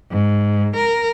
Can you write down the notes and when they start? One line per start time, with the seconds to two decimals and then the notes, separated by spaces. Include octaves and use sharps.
0.11 G#2
0.76 A#4